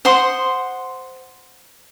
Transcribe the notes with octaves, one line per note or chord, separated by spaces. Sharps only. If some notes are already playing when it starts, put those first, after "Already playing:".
C5 F#5 C6 D#6